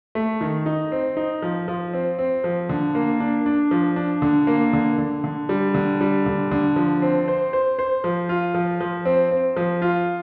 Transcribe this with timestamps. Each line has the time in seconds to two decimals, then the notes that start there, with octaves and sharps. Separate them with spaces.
0.15 A3
0.41 D#3
0.66 D#4
0.92 C4
1.17 D#4
1.42 F3
1.68 F3
1.93 C4
2.19 C4
2.44 F3
2.69 D3
2.95 A#3
3.20 D4
3.46 D4
3.71 F3
3.96 D4
4.22 D3
4.47 A#3
4.73 D3
4.98 D3
5.24 D3
5.49 G3
5.75 D3
6.01 G3
6.26 D3
6.51 D3
6.76 F3
7.02 C4
7.28 C5
7.53 C5
7.79 C5
8.04 F3
8.29 F4
8.54 F3
8.81 F3
9.05 C4
9.31 C4
9.57 F3
9.82 F4